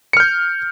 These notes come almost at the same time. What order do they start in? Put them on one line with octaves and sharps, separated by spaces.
C#7 F6 G6